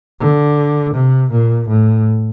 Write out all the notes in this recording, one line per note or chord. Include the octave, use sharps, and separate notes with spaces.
D3
C3
A#2
A2